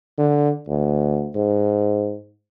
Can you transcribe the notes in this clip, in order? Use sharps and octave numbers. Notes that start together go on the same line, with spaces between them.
D3
D2
G#2